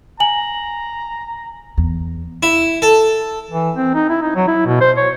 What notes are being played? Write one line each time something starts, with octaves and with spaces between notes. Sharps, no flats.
G#5 A#5 F#7
E2
E4
A4
E3
C4
D#4
E4
D#4
F#3
E4
B2
C5
C#5